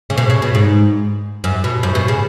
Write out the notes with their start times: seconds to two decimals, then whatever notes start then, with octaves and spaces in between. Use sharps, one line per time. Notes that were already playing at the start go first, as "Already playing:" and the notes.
0.10 C#3
0.17 B2
0.30 C#3
0.42 B2
0.55 G#2
1.44 F#2
1.64 B2
1.83 F#2
1.95 B2
2.08 C#3